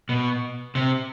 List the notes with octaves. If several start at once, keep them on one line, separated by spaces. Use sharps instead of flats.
B2
C3